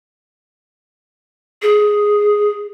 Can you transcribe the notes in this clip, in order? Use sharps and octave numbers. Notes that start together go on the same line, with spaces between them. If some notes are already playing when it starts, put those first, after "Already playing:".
G#4